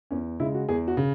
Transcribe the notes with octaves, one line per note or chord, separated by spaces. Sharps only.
E2 C#4
C#3 G#3 E4
F#4
E2 G#4
F#4
C#3